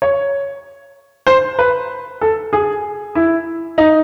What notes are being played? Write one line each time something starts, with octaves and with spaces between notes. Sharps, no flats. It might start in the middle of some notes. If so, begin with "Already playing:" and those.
C#5
C5
B4
A4
G#4
E4
D#4